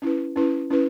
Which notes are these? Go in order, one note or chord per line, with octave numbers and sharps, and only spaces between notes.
C#4 E4 B4
C#4 E4 B4
C#4 E4 B4